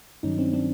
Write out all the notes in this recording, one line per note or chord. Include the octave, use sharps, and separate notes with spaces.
G2 D#3 F#3 C#4 D#4
C4 D4
C4 D4